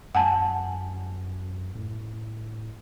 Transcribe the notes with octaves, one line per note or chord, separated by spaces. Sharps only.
F#2 F#5 G#5 A5
A2